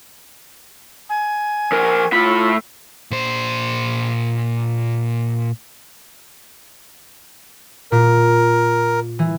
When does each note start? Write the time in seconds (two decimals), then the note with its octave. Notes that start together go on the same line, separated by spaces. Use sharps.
1.09 G#5
1.72 F3 A#4
2.12 A2 F4 B5
3.11 A#2 C5
7.92 A#2 A#4
9.19 E3